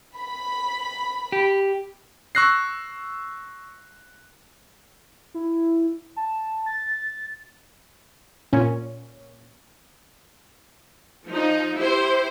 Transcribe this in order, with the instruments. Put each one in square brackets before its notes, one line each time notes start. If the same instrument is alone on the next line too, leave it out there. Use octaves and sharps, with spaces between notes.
[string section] B5
[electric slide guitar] G4
[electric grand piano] C#6 E6 F#6 A#6 C7
[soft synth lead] E4
A5
A6
[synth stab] A#2 C#4
[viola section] F3 D#4
E4 G4 C5